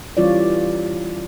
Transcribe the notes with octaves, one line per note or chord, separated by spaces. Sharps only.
E3 G3 C#4 F4 C#5 D5